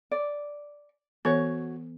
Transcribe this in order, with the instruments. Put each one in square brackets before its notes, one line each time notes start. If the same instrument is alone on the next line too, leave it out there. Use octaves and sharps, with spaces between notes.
[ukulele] D5
[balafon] E3 B3 A4 [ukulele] F#4 C#5